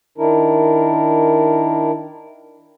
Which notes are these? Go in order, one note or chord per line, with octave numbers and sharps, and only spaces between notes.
D#3 D4 E4 A#4